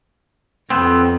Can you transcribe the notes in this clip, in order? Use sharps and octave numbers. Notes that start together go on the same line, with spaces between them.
F2 B3 C4